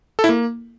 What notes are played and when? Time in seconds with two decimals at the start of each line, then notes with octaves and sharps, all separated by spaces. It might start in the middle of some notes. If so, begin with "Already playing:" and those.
0.19 A4
0.24 E4
0.29 A#3